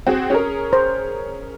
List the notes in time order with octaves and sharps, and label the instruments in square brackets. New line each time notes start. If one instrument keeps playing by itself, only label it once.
[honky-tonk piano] C4 F#4 G#4
C#4 G#4 A#4
[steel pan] C5